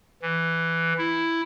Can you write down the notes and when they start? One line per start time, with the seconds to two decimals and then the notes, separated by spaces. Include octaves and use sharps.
0.22 E3
0.98 E4